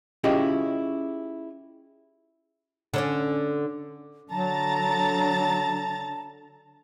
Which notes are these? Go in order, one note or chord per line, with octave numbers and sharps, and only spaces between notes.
C#4 E4 F4 G4 G#4 D#5
D3 C#4 D4
D3 F#3 A5 A#5 A6